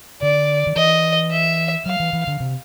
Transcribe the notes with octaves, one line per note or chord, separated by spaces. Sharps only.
D3 D5
D#3
E3 D#5
E5
F#3 F5
E3
E3
D3
C3